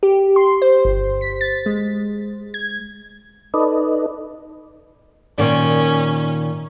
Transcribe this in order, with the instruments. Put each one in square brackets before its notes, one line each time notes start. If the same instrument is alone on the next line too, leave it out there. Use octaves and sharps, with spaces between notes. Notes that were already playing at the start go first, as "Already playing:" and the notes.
[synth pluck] G4
C6
C5
G1
B6
A6
G#3
G#6
[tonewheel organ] D#4 A4 B4 D5 D#5
[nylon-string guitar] A#2 D#3 D5 [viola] C#4